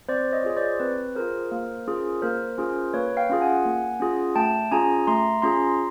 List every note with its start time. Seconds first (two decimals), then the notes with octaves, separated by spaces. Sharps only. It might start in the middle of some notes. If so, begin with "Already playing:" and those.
0.08 C4 C5 D5
0.32 C#5 D#5
0.44 F4 G#4
0.57 C5 D5
0.80 C4 B4
1.15 F4 G#4 A#4 C5
1.51 A#3
1.87 C#4 F4 G#4
2.22 A#3 A#4 C5
2.58 C#4 F4 G#4
2.94 A#3 B4 C#5
3.17 F5 G5
3.29 C#4 F4 G#4
3.41 F#5 G#5
3.65 A#3
4.00 C#4 F4 G#4
4.36 A3 G5 A5
4.72 C#4 F4 G#4 G#5 A#5
5.07 A3 A#5 C6
5.42 C#4 F4 G#4 A#5 C6